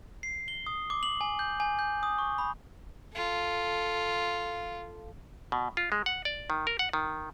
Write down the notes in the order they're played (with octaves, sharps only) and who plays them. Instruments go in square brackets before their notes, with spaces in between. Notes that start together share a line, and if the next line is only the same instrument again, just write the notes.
[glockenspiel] C7
G7
D#6
D6
F#7
G#5
G6
G#5
G6
D#6
C#6
B5
[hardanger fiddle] F4 A4
[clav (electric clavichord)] B2
F4
G#3
F#5
D5
D#3
A#4
F#5
D#3